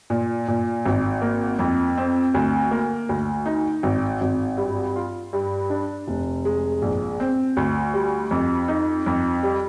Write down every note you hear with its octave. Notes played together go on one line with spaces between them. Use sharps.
A#2
A#2
G#1
A#3
F2
C4
D2
A#3
D2
D#4
G#1
G#1
G2
F4
G2
D4
F1
G#3
A#1
C4
D2
G3
F2
D#4
F2
G3